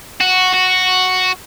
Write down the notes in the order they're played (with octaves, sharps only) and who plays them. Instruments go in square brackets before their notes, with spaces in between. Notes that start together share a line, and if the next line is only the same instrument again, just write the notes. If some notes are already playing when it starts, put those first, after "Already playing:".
[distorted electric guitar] F#4
F#4